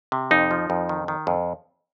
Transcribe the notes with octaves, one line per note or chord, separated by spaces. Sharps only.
C3
F2 D#4
F3
F2
D#3
D#3
F2